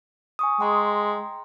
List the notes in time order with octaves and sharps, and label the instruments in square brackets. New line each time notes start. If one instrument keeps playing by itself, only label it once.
[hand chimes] G#5 C#6 D#6
[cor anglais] G#3 [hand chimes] G5 A#5 C6